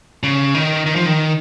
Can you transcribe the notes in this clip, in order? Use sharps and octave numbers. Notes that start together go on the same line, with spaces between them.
C#3
D#3
D#3
F3
D#3